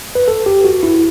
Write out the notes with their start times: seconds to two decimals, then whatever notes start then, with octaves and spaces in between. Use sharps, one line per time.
0.15 B4
0.28 A4
0.46 G4
0.65 F#4
0.83 E4